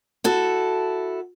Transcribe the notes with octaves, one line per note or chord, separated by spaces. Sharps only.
E4 F#4 A4